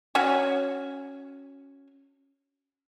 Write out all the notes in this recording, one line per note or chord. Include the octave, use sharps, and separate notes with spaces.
C#4 F#4 C#5 G#5